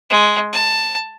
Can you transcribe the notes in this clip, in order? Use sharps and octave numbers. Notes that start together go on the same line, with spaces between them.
G#3
A5